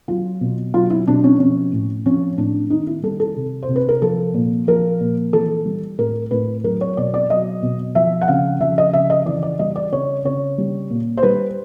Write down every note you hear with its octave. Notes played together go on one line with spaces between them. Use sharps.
F#3 F4
B2
F#3 F4
E4
B2 D4
C#4
F3 C#4
A2
F3 C#4
A2 D4
D#3 D#4
E4
G3 A4
A4
C3
C5
C3
B4
A#4
F3 A4
A#2
F3 A#4
A#2
E3 A4
G3
A2 A#4
A2 B4
F#3 A#4
C#5
B2 D5
D5
F#3 D#5
B2
F3 E5
F#5
C#3 F5
F3 E5
D#5
C#3 E5
D#5
E3 D5
D5
G3 D#5
D5
C#3 C#5
C#3 C#5
G3
A#2
C5
G3 B4